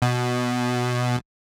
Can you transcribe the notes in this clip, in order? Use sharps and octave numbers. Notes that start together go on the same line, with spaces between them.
B2